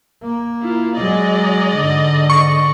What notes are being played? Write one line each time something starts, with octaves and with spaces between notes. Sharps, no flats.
A#3
E4 F4
F#3 G#3 D5 D#5
G#2 D3
C#6